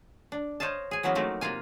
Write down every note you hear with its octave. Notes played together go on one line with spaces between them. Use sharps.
D4
C5 C#5 D#5 F5 A5
G#4 G#5
E3 F#3 G#3 A#3 B3 C#4
F3 F#3 A3 A#3 C4 D#4
C3 A#3 F4 F5 G#5